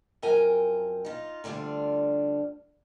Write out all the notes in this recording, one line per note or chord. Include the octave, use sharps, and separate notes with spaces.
F#2 F3 C4 A#4 G5 G#5
D#4 F4
D2 D3 G3 D4 F4